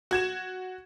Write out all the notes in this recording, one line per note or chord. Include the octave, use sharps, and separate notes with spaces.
F#4 G#6 E7